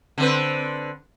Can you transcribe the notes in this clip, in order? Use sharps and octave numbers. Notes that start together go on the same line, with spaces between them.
D3 C4 B4